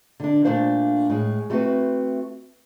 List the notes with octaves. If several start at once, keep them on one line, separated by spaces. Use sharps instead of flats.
D3 D4
A#2 F3 A3 D4 C5 F5
A2 G#3
G3 A3 C4 E4 F#4 B4